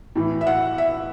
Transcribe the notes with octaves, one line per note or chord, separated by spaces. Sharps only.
A2 E3
E5
F#5
E5